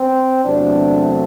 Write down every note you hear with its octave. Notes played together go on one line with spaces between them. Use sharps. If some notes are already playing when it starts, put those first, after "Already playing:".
Already playing: C4
E2 C3 F#3 A3 D4